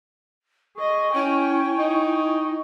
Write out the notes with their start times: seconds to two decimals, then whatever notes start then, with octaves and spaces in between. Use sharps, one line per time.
0.77 G#4 D#5 C#6
1.15 C#4 E4 G5 G#5
1.78 D#4